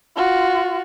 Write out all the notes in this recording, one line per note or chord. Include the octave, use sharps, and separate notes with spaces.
F4 F#4